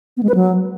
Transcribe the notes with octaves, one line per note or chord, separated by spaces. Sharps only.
B3
G#3
B4
F#3